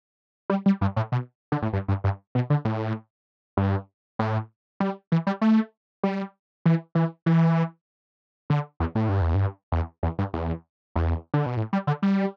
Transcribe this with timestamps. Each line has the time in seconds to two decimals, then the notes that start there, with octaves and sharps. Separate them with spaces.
0.50 G3
0.66 G3
0.81 G2
0.96 A2
1.12 B2
1.52 D3
1.62 A2
1.73 G2
1.88 G2
2.04 G2
2.35 B2
2.50 D3
2.65 A2
3.57 G2
4.19 A2
4.80 G3
5.12 E3
5.27 G3
5.41 A3
6.03 G3
6.65 E3
6.95 E3
7.26 E3
8.50 D3
8.80 E2
8.95 A2
9.09 G2
9.21 E2
9.35 G2
9.72 E2
10.03 E2
10.19 G2
10.34 E2
10.96 E2
11.34 D3
11.46 B2
11.57 A2
11.73 G3
11.87 D3
12.02 G3